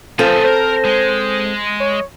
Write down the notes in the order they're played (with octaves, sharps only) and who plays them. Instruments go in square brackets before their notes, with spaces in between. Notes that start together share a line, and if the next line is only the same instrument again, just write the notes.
[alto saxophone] F3 [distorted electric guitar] A3 G#4 [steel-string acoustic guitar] C4 A4
[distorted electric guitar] A#4 [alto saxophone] C5
[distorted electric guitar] G#3
[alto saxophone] C#5